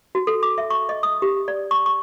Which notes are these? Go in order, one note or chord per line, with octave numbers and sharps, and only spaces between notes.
F#4
A4
D6
E5
C#6
D#5
D#6
G4
D5
C#6
C#6